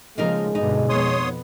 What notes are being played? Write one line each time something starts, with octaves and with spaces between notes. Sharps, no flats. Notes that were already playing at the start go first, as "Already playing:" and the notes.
C#3 F3 G#3 A#3 D#4 A#4
G2 B2 D3 D#4
F2 B3 C#5 C6 D#6